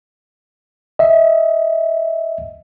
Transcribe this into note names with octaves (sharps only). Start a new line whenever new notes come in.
D#5 E5